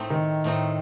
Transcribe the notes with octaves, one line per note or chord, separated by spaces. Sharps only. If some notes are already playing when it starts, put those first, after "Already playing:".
Already playing: A2 A3 C4 D#4
D#3
A2 A3 C4 D#4